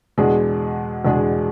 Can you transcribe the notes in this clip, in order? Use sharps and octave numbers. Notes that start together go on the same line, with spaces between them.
E2 B2 G#3 D4 G#4
E2 B2 G#3 D4 G#4